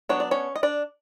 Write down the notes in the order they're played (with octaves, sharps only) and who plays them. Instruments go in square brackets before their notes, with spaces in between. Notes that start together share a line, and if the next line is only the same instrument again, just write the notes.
[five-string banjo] F#3 B3 D4 C#5
D5
C#4 C#5
D#5
D4 D5